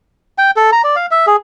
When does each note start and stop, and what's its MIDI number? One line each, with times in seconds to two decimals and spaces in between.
0.38 0.51 79
0.56 0.70 69
0.72 0.82 82
0.84 0.96 74
0.96 1.06 77
1.11 1.26 76
1.27 1.36 68